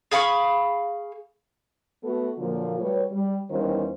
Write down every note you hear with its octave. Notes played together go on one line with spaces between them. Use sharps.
G#4 F5 B5 C#6
A3 B3 F#4 A4
A#2 D3 F3 F#3 A#3 F4
G3 A3 F#4 B4 C#5
G3
E2 D#3 G3 C#4 F4 C5